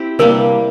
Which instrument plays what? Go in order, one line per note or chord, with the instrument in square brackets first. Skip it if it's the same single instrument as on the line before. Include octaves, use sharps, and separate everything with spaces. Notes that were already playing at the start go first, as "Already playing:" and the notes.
Already playing: [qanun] C4 E4 G4
[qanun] C3 G3 A#3 D4 [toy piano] A#4